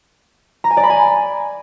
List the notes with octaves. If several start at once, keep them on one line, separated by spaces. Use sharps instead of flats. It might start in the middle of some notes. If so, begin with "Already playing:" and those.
A#5
G#5
D5
B5
G#5